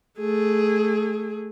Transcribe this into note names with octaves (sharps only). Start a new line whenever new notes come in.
A3 G#4